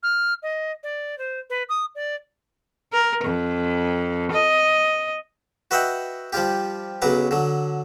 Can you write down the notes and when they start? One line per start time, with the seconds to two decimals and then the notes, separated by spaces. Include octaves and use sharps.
0.03 F6
0.43 D#5
0.83 D5
1.18 C5
1.50 B4
1.69 D#6
1.95 D5
2.93 A#4
3.24 F2
4.32 D#5
5.71 F#4 B4 D#5 E5 F#5 G5
6.33 F3 G3 F4 G4
7.02 B1 C#3 F#3 B4 A#5 D6
7.31 D3 F#3